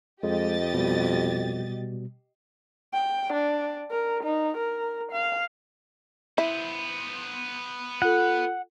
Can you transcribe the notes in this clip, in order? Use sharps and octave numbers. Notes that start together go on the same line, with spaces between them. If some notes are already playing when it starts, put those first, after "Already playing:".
F2 G#3 G4 D#5 A6
B2 G3
G5
D4
A#4
D#4
A#4
F5
B3 E4 C5
F4 A4 F#5